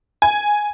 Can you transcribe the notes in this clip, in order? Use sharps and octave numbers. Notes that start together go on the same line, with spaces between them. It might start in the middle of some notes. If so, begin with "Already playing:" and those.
G#5